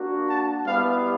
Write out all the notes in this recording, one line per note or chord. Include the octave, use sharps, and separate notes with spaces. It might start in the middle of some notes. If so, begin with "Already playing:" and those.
Already playing: A#3 D4 F#4
A5
G3 B3 E4 G4 F5